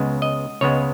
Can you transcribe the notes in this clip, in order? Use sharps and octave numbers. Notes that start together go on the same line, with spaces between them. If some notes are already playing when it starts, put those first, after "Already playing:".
Already playing: C#2 C#3 G#3 B3
D#5
C#2 C#3 G#3 B3 C#5